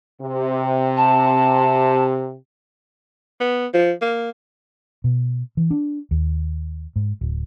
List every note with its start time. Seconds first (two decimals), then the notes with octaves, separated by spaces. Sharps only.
0.22 C3
0.97 A5
3.40 B3
3.74 F3
4.02 A#3
5.04 B2
5.57 E3
5.71 D4
6.11 D#2
6.96 G#2
7.21 D1